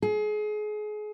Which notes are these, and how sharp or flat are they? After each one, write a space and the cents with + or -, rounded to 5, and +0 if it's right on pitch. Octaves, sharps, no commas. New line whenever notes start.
G#4 +30